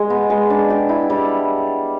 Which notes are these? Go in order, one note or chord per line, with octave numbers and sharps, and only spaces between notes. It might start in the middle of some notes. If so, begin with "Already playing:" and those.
Already playing: G#3
B3
G#3
D4
G4
E4
G3